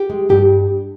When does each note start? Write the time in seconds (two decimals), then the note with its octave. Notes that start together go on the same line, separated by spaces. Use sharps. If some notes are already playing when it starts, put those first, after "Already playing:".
Already playing: G4
0.10 G#3
0.29 G2 G4